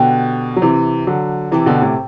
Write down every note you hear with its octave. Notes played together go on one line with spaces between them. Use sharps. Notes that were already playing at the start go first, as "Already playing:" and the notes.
Already playing: B2 D3 G4 C5 G5
F#3
C3 E3
D3 F#3
C3 E3 E4 G4 D5 A5
B2 D3
A2 C3